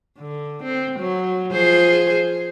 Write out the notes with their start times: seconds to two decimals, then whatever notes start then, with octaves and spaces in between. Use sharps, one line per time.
0.18 D3
0.63 C4
0.99 F#3
1.52 F3 G#4 C5